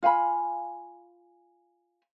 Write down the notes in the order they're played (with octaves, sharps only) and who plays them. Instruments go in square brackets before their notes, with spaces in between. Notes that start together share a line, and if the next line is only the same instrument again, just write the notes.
[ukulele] F4 F5 G#5 B5